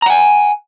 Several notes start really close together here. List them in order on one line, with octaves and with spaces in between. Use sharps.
A#5 F#5 G#5